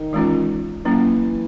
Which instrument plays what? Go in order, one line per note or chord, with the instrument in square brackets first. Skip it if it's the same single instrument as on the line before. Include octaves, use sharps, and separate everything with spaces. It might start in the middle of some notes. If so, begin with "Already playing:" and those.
Already playing: [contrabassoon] D#3
[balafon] E3 G#3 C#4 F4
[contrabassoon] E3 [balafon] F#3 A#3 C#4